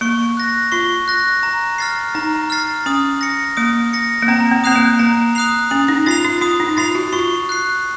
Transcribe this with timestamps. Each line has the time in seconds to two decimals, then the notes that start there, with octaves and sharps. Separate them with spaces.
0.01 A#3 C#6
0.37 F#6 A#6
0.72 F4 C#6
1.08 F#6 A#6
1.43 A#5
1.78 F6 A6 C7
2.15 D#4 A#5
2.50 F6 A6 C7
2.86 C#4 D#6
3.21 A#6 C#7
3.57 A#3 D#6
3.93 A#6 C#7
4.22 A#3
4.28 C4 A#5
4.51 C4
4.64 C4 D#6 F#6 C7 F7
4.76 A#3
4.99 A#3 A#5
5.35 D#6 F#6 C7 F7
5.70 C#4 D#6
5.89 D#4
6.06 F4 A6 C7 F7
6.25 F4
6.41 F4 D#6
6.60 D#4
6.77 F4 A6 C7 F7
6.95 F#4
7.13 F4 C#6
7.49 F#6 C7